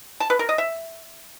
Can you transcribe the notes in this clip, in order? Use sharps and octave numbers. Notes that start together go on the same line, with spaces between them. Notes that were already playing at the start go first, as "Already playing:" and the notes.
A5
B4
A#4
D#5
E5